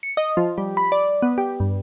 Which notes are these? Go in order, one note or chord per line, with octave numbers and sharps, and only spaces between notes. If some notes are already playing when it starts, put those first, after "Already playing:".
C#7
D#5
F3
G3
B5
D5
B3
G4
G2